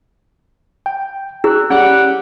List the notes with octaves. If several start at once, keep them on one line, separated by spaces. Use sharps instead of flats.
G5
E4 G#4 E6 F#6
G3 C#4 F#5